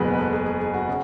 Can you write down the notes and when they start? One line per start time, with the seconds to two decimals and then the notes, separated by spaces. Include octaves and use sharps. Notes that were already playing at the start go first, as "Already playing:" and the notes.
Already playing: F#1 E2 B2 G#3 B3 G#4 B4
0.13 B4
0.18 A4
0.33 G#4
0.46 G#4
0.60 G#4
0.74 F#4
0.88 C#3